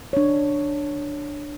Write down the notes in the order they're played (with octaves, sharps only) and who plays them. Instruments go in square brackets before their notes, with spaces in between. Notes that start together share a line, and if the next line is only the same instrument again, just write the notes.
[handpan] D4 C#5